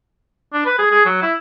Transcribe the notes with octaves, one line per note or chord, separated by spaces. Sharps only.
D4
B4
G#4
G#4
F#3
E4